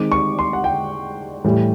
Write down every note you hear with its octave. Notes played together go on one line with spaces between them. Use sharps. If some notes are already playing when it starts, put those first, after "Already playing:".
Already playing: D#3 G#3 C4 D6
C#6
C6
F#5
G5
A2 E3 G3